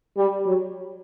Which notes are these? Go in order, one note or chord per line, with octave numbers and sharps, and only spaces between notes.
G3
F#3